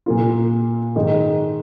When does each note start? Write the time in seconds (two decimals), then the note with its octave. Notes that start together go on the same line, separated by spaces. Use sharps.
0.06 A#2 A#3 F4
0.96 G#2 D#3 G#3 D#4